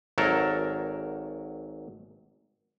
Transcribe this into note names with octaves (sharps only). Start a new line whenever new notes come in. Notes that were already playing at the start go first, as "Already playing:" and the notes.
G#1 F#3 A4 A#4